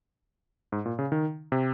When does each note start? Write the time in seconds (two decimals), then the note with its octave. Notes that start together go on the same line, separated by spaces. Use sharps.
0.72 G#2
0.86 A#2
0.99 C#3
1.12 D#3
1.52 C3